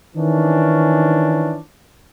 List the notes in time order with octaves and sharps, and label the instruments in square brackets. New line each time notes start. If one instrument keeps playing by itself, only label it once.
[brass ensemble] D#3 E3 C#4 D4